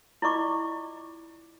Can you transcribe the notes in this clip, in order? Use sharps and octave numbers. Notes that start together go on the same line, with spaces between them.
E4 F4 D5 D#5 C#6 D6